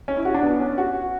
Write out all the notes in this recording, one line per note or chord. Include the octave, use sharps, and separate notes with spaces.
C#4
E4
F#4
D4
B3
C#4
F#4